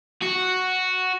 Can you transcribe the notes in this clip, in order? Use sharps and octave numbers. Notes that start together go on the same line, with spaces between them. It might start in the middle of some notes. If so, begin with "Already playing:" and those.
F#4